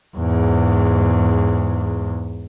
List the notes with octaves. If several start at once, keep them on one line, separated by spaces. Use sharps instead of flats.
E2 G#2